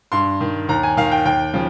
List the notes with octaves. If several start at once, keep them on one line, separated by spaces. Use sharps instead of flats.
G2 C6
D#3
D#2 A#5
G#5
D#3 F5
G5
D#2 G5
C#3 F3